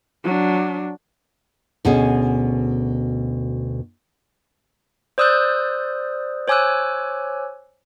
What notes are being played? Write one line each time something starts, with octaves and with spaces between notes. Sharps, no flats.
F#3 D4
D2 B2 C#4 G#4
C5 D5 D#6 E6 F#6 G6
C5 C#5 G#5 D6 E6 F#6